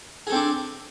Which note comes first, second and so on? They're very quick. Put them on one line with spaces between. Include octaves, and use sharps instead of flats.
G#4 A4 C4 D4